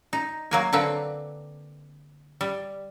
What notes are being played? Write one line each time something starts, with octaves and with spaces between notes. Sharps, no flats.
D#4
F#3 A#3 G#5
D3 A#3 C4 B4
G3